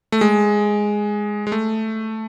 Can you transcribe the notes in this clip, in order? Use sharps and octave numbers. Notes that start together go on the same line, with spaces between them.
A3
G#3
G#3
A3